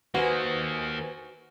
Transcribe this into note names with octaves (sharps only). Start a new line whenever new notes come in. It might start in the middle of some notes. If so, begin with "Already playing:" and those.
D#3 A#3 F#4 B4 C5 G#5